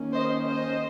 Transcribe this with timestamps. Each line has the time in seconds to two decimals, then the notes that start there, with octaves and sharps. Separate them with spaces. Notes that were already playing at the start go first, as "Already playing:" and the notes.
Already playing: D#3 A#3 C#4
0.15 C5 D#5
0.45 C5 D#5